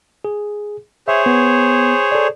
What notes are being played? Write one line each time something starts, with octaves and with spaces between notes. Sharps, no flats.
G#4
G#4 C5 C#5 E5
B3
A4 D5